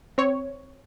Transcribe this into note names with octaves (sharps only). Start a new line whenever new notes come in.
C4 C#5